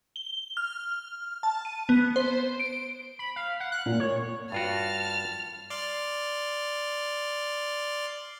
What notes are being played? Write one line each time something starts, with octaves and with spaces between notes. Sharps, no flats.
G7
F6
A5
D#7
B3
C5
D7
B5
F5
F#5
F#6
A#2
C#5
G2 F4 F#4 A5 F6
D5 C6 F6